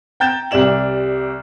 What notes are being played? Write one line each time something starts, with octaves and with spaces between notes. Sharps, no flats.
G5 A#5 G6 A6 E7
C2 G4 D5 E7 F#7